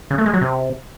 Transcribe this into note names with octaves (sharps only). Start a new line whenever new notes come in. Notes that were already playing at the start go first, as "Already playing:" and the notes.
C#3
A3
G#3
F#3
C3